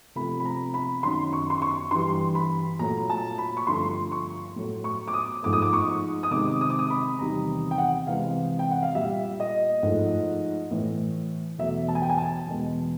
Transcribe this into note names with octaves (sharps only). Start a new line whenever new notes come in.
C3 F3 A3 B5
B5
A#5
B5
F#2 D#3 F#3 C6
C#6
C6
C#6
G2 E3 G3 C6
B5
A#2 F#3 A3 A#5
A5
B5
C#6
G2 D3 F3 A3 C6
C#6
A2 F#3 A3
C#6
D6
D#6
G#2 F3 A3 D6
D#6
D6
C#6
D#6
C3 D#3 G#3 D6
D#6
D6
D#6
B5
E2 C3 D#3 G3 A#5
G5
F#5
C3 E3 G#3 F5
G5
F#5
F5
A#2 G3 E5
D#5
G#2 F3 A3
A2 E3 A3
E2 B2 F#3 A3 E5
A5
G#5
G5
G#5
A5
E2 B2 G#3